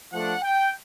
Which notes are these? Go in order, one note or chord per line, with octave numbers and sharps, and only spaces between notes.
F3 A3 D4 F#5
G5